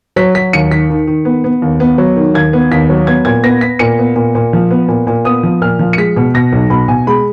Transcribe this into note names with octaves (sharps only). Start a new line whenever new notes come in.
F#3 B6
F#3 B6
D#2 C#7
D#3 B6
D#3
D#3
B3
B3
D#2
B3
F#3
D#3
D#2 G#6
B3
D#2 B6
F#3
B3 G#6
A#2 G#6
B3 A#6
B3 B6
A#2 C#7
B3
A#2
A#2
F3
B3
A#2
A#2
B3 D#6
F3
A#2 F6
F3
C#7
G#3 B6
B2
B2 A#6
B1
B2 B5
B2 G#5
G#3 B5